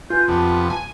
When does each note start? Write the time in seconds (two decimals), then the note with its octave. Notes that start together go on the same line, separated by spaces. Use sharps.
0.10 F4 B4 G#5 G6
0.28 F2 C3 B3 A5
0.70 G#5